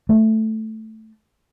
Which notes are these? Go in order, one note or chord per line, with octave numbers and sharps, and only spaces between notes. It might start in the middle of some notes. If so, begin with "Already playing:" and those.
A3